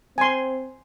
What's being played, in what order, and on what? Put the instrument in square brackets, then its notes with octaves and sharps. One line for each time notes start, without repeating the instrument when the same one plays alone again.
[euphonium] C4 [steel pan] G#5 C6